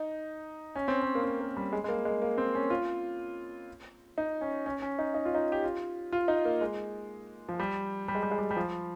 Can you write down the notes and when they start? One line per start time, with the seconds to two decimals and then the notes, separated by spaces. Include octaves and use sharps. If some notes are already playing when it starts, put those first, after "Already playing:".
Already playing: D#4
0.75 C#4
0.88 C4
1.02 C#4
1.15 A#3
1.24 C4
1.41 A#3
1.57 G3
1.73 G#3
1.84 G#3
1.88 A#3
2.05 G#3
2.22 A#3
2.38 C4
2.55 C#4
2.70 F4
4.18 D#4
4.41 C#4
4.66 C#4
4.82 C#4
4.99 D#4
5.14 D#4
5.25 F4
5.35 D#4
5.52 G4
5.64 F4
6.12 F4
6.28 D#4
6.45 A#3
6.61 G#3
7.49 F3
7.59 G3
8.08 G3
8.15 G#3
8.23 G3
8.31 G#3
8.38 G3
8.51 G3
8.56 F3